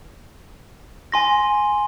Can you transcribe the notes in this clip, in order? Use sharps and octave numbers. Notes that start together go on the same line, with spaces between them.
G#5 C6 A#6